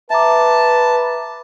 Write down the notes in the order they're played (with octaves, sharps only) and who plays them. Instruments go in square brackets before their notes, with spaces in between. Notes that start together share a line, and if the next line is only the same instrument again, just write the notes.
[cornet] B4 [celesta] E5 A#5 D6 [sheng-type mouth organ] A5